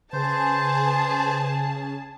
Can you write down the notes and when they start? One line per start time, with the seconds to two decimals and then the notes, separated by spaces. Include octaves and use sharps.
0.13 C#3 G#4 B4 C5 A5